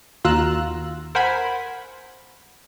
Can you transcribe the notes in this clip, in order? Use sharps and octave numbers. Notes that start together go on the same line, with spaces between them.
D#2 F4 F#4 A#5 E6 F#6
A#4 C5 F#5 G#5 B5